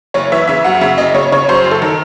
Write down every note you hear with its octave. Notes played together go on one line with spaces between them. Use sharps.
F#1 C#5
E3 E5
C#3 E5
F#2 F#5
C#3 E5
F#1 D#5
C#3 C#5
C#3 C#5
F#2 C5
F#1
A4
D#3